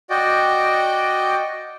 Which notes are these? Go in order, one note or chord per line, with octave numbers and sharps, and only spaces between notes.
F#4 D5 D#5 G5